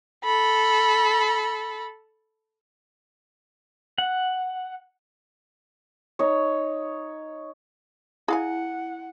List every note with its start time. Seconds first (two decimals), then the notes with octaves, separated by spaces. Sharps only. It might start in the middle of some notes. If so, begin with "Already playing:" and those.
0.24 A4 B5
3.98 F#5
6.19 D#4 C#5
8.28 E4 G#4 F5 F#5 G#5